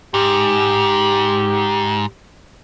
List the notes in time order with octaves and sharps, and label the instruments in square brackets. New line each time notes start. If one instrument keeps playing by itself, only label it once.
[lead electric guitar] G#2 [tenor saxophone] G4